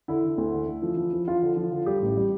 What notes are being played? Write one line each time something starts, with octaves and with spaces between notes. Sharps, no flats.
D3 E4
D3
D2
D3
D3
F3
F3
F3
F3 F4
D3
F3
D3
G3 G4
A1
G3